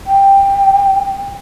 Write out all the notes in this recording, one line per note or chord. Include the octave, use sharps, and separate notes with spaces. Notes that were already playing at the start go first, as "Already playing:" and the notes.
G5